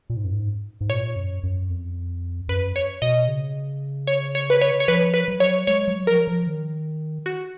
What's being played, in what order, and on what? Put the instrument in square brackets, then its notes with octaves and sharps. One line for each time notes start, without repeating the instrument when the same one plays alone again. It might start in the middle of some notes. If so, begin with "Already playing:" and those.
[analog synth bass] A#2
G#2
F#2
G#2
G#2
[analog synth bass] A#2 [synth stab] C#5
[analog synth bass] F#2
F#2
F2
[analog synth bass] F#2 [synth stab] B4
[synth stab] C#5
[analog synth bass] B2 [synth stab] D#5
[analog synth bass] C#3
[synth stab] C#5
C#5
B4
C#5
C#5
[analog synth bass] F3 [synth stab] B4
[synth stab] B4
[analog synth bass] F#3
[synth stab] C#5
[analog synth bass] G#3 [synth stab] C#5
[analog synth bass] F#3
[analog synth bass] F3 [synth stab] A#4
[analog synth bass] F3
D#3
[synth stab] F#4